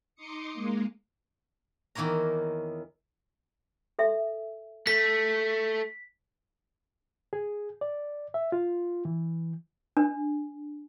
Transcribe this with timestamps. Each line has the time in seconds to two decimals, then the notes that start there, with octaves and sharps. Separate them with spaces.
0.15 D#4 C6 D6 D#6 C#7
0.53 G#3 A#3
1.95 E2 D#3 A#3 C#5 A#5
3.99 A4 E5
4.87 A3 B6
7.33 G#4
7.81 D5
8.34 E5
8.52 F4
9.05 E3
9.97 D4